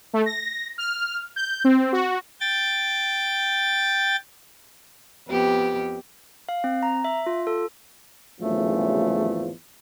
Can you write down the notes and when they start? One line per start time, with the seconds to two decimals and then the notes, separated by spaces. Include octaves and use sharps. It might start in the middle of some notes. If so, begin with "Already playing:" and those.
0.13 A3
0.26 A#6
0.78 F6
1.36 G6
1.64 C4
1.93 F#4
2.40 G5 A6
5.28 F2 B3 G4
6.49 F5
6.64 C4
6.83 A#5
7.04 E5
7.27 F4
7.47 A4
8.41 G#1 E2 G2 C#3 F3 F#3 A3